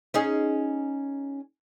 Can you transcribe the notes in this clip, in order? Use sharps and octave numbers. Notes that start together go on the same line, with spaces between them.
C#4 D#4 G#4